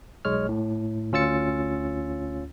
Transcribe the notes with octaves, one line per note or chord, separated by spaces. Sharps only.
B1 G#3 C#5 F6
A2
D2 C#4 F4 E6 A6 C#7